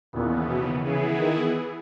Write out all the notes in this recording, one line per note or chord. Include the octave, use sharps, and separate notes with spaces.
D#2 A#2 C#3 E3 B3
B2
C#3 E3 B3 E4 G#4
D#3